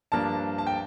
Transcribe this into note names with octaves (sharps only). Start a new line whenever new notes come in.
G2 F3 A#3 D4 A5
A5
G5